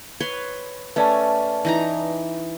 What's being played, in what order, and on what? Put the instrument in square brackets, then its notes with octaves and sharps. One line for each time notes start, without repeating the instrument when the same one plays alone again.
[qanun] B4 C#5 C6
[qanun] A3 C#4 [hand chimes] B4 D5 A5
[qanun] E3 D#4 A#5